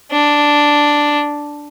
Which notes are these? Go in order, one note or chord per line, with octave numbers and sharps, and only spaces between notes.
D4